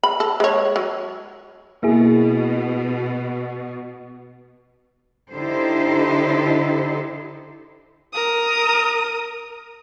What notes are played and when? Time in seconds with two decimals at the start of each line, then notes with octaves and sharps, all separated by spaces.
0.03 B5
0.20 A4
0.40 G#3 C#5
0.76 F#3
1.83 B2 A#3 E4 G#4
5.31 D3 D#4 E4 G4 A4 C5
8.13 A#4 D#6